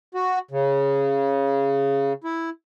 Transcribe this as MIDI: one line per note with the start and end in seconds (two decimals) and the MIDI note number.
0.15 0.39 66
0.51 2.13 49
2.24 2.50 64